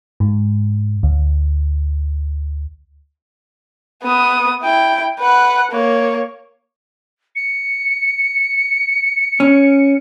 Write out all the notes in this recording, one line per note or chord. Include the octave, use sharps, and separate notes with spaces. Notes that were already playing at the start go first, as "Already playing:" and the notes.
G#2
D2
B3 D#6
E4 G5
B4 F#5
A#3 C#5
C#7
C#4